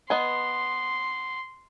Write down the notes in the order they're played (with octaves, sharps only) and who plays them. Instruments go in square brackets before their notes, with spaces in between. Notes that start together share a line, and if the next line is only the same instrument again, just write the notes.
[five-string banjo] B3 D#5 G#5 [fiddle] C6